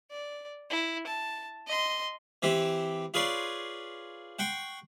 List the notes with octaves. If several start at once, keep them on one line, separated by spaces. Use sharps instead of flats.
D5
E4
A5
D#5 C6
E3 C4 E4 G4
F4 G#4 B4 C#5 D5 C6
F#5 G5 C6 C#6